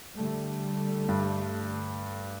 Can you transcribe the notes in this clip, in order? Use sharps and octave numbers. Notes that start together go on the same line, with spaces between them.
D3 G3 A3
G2